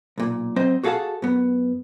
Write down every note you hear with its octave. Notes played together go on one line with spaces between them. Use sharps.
B1 A#2
F#3 C4 C5 D#5
F#4 G#4 A4 F5 F#5 A5
F#2 B3